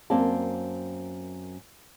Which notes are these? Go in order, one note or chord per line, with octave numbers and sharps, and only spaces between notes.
F#2 A#3 C4 D5 A5